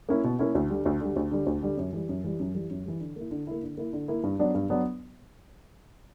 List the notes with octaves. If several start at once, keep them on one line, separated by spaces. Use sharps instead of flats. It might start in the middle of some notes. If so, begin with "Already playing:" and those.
A#3 C#4 E4
B2
A#3 C#4 E4
D2
D3 G3
D2
D3 G3
D2
D3 G3
D2
D3 G3
F#2
E3 G3
F#2
E3 G3
F#2
E3 G3
F#2
E3 G3
D3
A#3 E4
D3
A#3 E4
D3
A#3 E4
D3
A#3 E4
G2
F#3 B3 D4
G2
F#3 B3 D4